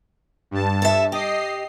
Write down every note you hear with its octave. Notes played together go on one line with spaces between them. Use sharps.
G2 A5
A4 E5
G4 D#5 C7